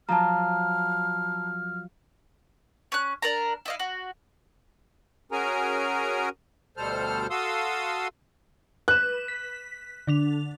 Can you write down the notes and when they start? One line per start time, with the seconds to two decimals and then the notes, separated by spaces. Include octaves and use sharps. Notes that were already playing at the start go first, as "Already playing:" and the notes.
0.09 F3 F#3 A5 A#5 F6
2.92 C#4 F#6
3.22 D4 A#4 A#5
3.66 E4 D#5 F5
3.80 F#4
5.32 C#4 F#4 G#4 A#4 G#5 A#5
6.77 D2 B2 G3 A4 C5 F6
7.30 F#4 A4 F5 C6 D#6 E6
8.88 B4 F#6 E7
9.28 B6
10.07 D3 D4 F7